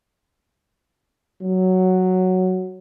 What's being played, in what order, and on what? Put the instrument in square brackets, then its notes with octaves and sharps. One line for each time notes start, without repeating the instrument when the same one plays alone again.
[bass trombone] F#3